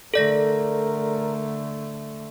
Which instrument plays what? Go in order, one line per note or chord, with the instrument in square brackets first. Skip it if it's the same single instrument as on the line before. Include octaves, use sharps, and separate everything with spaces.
[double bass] D3 A3 [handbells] A4 D5 A#6 [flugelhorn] A#4